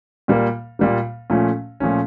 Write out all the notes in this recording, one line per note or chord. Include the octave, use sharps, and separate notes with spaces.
A#2 G3 A#3
A#2 G3 A#3
A#2 F3 A3 C#4
A#2 F3 A3 C#4